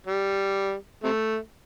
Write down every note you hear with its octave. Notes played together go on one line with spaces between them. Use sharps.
G3
C3 A3